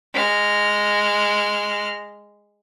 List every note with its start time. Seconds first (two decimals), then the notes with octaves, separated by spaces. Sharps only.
0.14 G#3 F6